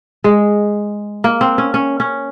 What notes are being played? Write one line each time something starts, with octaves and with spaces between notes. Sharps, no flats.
G#3
A#3
C4
C#4
C#4
C#4